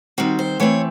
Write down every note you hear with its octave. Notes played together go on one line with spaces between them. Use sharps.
D#3 G3 C4 F#4
C5
E3 A3 C4 C#5